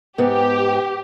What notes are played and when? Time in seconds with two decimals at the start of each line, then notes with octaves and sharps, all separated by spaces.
0.18 G#2 B3 G4